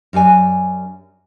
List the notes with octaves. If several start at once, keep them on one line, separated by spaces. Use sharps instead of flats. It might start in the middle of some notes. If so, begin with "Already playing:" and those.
F#2 G4 D5 G#5